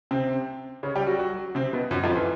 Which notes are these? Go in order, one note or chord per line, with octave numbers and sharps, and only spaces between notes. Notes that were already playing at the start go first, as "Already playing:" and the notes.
C3 C4
C#3 C#4
G3 G4
F#3 F#4
F#3 F#4
C3 C4
B2 B3
F#2 F#3
F2 F3
E3